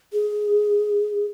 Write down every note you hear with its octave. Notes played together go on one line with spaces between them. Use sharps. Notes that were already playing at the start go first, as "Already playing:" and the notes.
G#4